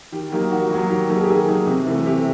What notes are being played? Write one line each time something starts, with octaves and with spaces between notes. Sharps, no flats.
D#3 G4
F#3 A#3 D#4 G4
D#3 F#4
F#3 A#3 D#4 F#4
D#3 G4
F#3 A#3 D#4 A4
G#4
G4
D#3 G#4
F#3 A#3 D#4
C3
E3 A3
C3 G4